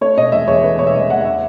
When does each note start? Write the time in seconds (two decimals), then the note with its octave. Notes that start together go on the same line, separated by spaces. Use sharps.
0.01 A3 C#5
0.17 B2 D#5
0.32 E1 E5
0.48 E2 C#5
0.64 A3 B4
0.79 B2 C#5
0.87 E5
0.95 E1 D#5
1.10 E2 F#5
1.21 F#5
1.25 E5